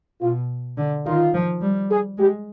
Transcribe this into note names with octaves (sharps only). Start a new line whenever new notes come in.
B2 F4
D3
D#3 F4
F3
G3
G#4
G#3 G4